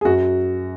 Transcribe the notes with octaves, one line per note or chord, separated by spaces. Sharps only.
G#4
F#2 F#4